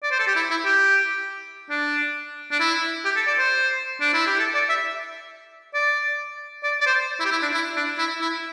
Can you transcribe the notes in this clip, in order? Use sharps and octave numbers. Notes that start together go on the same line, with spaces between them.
D5
C5
A4
G4
E4
E4
G4
D4
D4
E4
G4
A4
D5
C5
D4
E4
G4
A4
D5
E5
D5
D5
D5
C5
E4
G4
E4
D4
E4
D4
E4
E4